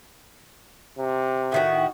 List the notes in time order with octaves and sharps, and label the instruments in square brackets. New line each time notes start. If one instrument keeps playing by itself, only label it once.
[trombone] C3
[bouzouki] A2 D#3 F#4 [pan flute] E5